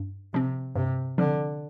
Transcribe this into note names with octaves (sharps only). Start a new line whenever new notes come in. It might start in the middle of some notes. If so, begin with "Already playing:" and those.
Already playing: G2
C3 F3 C4
G2 C3
D3 F3 C4